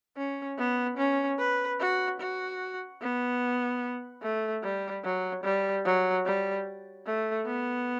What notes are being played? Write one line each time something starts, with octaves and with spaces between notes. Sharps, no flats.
C#4
B3
C#4
B4
F#4
F#4
B3
A3
G3
F#3
G3
F#3
G3
A3
B3